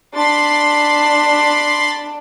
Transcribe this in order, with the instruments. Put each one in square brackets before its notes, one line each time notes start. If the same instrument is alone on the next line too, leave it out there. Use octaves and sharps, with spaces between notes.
[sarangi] D4 [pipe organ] B5 C6 A6